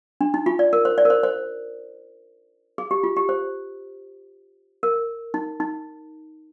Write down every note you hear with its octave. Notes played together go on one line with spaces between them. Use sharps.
D4
D#4
F4
D5
A#4
C5
D5
A#4
C5
C5
G#4
G4
F4
G4
C5
A#4
D#4
D#4